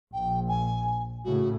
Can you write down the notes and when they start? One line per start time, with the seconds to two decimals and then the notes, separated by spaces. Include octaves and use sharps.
0.13 A#1 G5
0.49 G#5
1.25 A2 C#3 F#4